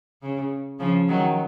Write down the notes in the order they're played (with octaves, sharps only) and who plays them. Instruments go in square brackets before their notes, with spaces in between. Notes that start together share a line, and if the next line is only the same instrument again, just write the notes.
[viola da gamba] C#3
C#3 F3
D#3 F#3